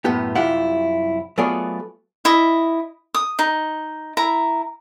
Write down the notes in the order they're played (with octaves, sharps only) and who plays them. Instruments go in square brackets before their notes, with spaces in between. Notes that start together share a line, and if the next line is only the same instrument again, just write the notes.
[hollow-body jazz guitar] F#2 A2 B3 G4
C2 F#2 E4 F4 G4 F#5
F#3 A3 B3 F4 G#4 D5
[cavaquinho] E4 D#5
D#6
D#4
E4 A#5